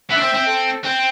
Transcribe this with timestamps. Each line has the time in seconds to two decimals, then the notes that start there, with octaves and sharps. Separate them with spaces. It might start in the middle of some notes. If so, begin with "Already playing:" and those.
0.10 B3 E5
0.17 D4
0.22 C4
0.34 C4
0.47 A4
0.84 C4